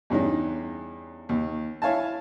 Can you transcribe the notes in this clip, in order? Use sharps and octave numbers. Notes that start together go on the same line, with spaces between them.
E2 G2 C#4 D#4
D#2
E4 C#5 F5 G#5 A5